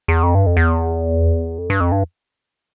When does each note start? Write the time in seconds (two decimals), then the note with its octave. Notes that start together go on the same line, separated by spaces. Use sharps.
0.08 E2
0.23 F2
0.35 G2
0.46 F2
0.57 E2
1.58 F2
1.70 G2
1.81 F2
1.92 G2